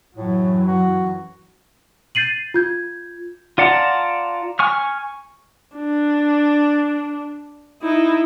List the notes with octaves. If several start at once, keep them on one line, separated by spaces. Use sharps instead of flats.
F#2 A2 E3 F#3
F#4
G6 A6 C7 D#7 F#7
F4 G6 G#6
F4 D5 F#5 A5 A#5
G#5 C#6 F6
D4
D#4 E4